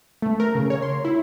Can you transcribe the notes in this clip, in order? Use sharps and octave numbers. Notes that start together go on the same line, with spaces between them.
A3
A#4
C#3
C#5
C6
E4